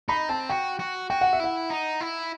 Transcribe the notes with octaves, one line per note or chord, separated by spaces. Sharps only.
D#4 B5
C4 A5
F#4 G5
F#4
F#4 G5
F#5
E5
E4 F#5
D#4
E4